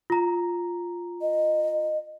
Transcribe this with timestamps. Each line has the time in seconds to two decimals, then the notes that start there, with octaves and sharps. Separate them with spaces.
0.10 F4 A#5
1.21 D#5